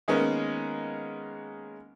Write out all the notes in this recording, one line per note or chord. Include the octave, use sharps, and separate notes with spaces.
D#3 G#3 A#3 B3 C#4